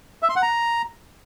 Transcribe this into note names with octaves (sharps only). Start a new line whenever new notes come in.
E5
C6
F#5
A#5